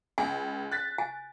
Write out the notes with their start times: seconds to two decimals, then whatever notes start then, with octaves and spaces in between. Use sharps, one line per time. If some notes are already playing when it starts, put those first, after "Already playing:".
0.18 C#2 G#5
0.72 F#6 A6 B6
0.98 G#5